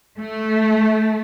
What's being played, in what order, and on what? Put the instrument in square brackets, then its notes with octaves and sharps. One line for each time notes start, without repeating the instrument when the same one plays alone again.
[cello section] A3